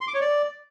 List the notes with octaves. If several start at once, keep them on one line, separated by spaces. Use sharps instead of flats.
C6
D6
C#5
D5